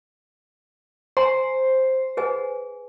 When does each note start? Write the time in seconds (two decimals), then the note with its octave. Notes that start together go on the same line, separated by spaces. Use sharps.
1.17 C5 G#5 A#5 C6
2.17 G#4 B4 G#5